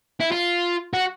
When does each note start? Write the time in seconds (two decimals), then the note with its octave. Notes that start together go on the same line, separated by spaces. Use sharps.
0.20 E4
0.32 F4
0.94 F#4